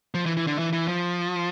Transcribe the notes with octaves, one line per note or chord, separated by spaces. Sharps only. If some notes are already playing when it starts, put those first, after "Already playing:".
F3
E3
E3
D3
E3
E3
F3